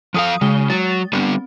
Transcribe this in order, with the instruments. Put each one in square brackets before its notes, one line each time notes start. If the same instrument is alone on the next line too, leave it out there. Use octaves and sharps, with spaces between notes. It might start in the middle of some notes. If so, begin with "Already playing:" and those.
[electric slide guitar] F3 A4 F5 [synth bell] D#6 D#7
[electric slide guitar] C#3 [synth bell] G#3 D#6 G7
[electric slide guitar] F#3 [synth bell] A6
[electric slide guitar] G3 B3 D4 [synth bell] C4